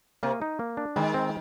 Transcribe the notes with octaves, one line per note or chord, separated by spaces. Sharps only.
C3 A#3
D#4
A#3
D4
D#3 G#3
C4